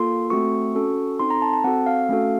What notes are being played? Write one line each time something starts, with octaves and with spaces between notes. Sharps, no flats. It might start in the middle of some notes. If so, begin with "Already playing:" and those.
Already playing: A#3 F4 A4 C6
A3 C4 F#4 A4 C#6
C#4 F#4 A4
C4 D#4 A4 C6
A#5
A5
A5
C4 F#4 A4 F#5
F5
A3 C#4 F#4 A4